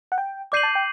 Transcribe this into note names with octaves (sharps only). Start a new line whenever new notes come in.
F#5
G5
D5 D6 G6 C7 D#7 F#7
A5
G5